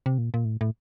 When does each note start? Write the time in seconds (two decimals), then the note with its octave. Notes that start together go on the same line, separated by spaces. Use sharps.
0.06 C3
0.18 A#2
0.34 A#2
0.45 A2
0.61 A2